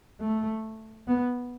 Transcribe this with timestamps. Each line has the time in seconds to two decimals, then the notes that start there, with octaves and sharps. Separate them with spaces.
0.21 A3
1.07 B3